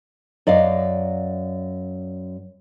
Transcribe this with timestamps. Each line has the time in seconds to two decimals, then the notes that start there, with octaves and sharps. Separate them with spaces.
0.47 F#2 D5 D#5 F5